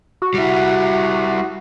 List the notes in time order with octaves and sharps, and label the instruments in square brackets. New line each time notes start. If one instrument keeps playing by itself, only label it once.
[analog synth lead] F#4
[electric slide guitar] G3 E4